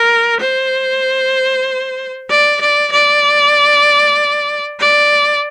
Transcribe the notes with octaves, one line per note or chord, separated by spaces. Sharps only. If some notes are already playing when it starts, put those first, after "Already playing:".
Already playing: A#4
C5
D5
D5
D5
D5